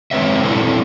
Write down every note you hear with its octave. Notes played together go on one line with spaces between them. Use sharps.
G#3 C4 B4 C#5 E5
A#2 G3 C4 E4 A4